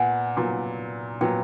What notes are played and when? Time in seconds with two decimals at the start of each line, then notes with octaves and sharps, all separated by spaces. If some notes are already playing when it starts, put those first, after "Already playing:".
Already playing: A#2 B3 F#5 G#5
0.37 A#2 F#3 B3
1.21 A#2 F#3 B3 G5